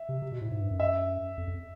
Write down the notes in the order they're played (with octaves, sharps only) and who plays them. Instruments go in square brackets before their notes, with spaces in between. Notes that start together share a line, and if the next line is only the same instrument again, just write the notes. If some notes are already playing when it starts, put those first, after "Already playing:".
Already playing: [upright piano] E5
[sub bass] C3
C3
B2
A2
G#2
G2
F#2
[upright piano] E5
[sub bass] F2
F2